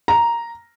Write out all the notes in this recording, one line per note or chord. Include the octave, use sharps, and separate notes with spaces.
A#5